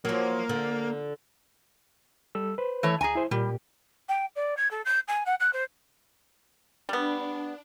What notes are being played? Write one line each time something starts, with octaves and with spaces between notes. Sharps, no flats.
F3 F#3 A#3
D3
G3 A4 E6
B4 C5
E3 A3 C#5
D2 G#4 G#5 A#5
E4 C5
A#2 G3 A#3 G4
G5
D5
G#6
A4
G6
G#5
F#5
F#6
C5
G3 B3 D4